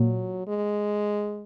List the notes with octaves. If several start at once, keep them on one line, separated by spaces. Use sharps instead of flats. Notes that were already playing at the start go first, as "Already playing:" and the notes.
Already playing: A#2 F#3
G#3